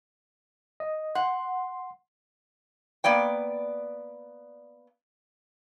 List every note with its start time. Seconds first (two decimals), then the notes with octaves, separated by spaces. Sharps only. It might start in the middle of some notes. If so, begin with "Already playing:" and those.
0.80 D#5
1.15 F#5 C6
3.04 A#3 B3 D5 G5